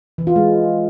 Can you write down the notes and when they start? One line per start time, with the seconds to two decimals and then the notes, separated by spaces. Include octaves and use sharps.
0.18 E3
0.27 F4
0.36 G#3